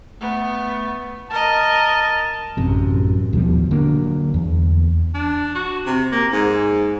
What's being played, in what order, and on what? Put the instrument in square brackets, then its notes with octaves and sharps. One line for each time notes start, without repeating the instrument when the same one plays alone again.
[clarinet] A3 [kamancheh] B3
[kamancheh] A#4 D#5 [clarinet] A5
[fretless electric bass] A1 F#2 C3
D#2 B2 F3 G3
D3 F#3 A#3 D4
E2
[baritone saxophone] D4
F#4
C3
A#3
G#2